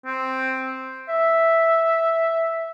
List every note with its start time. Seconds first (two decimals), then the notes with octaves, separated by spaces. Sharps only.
0.06 C4
1.09 E5